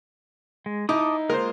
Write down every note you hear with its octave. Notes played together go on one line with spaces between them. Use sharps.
G#3
D#4 E4 A5 D6 D#6
G#3 A#3 F4 A#4 C5